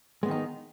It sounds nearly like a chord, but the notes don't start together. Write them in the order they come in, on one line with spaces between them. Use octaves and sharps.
G#3 B3 D#3 D#4